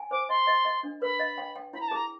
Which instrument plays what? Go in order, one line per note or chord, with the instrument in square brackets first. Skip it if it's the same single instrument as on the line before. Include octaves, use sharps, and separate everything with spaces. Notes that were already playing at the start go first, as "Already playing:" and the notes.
Already playing: [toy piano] G#5
[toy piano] C5 [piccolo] D6
[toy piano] D#5 [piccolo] C6
[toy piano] D#5
D#5
D4
[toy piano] B4 [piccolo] B5
[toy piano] D#5
G5
G5
[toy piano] E4 [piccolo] B5
[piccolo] A#5
A5
[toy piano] G#4 [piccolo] A#5